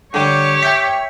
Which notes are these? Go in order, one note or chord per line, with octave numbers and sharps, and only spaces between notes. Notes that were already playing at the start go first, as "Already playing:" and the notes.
D3 G3 G4 C#5
E5 G5 G6 B6